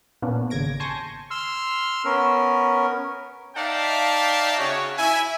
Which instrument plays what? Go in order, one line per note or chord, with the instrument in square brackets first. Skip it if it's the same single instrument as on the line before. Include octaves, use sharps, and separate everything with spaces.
[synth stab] A#2 A#3 B3 C#4 D4
G#1 D#2 C#3 G#6 A#6 D7
G#5 A5 C6 C#6 G6 A#6
[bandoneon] C6 E6 F6
B3 C#4 A#4
[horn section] D#4 D5 E5 F5 G5 A5
C#3 F#4 C#5
E4 E5 G#5